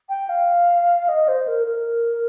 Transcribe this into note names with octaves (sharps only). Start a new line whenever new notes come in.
G5
F5
D#5
C5
A#4
A#4